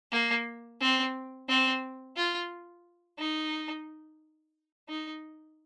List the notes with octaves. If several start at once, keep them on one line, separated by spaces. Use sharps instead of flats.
A#3
C4
C4
F4
D#4
D#4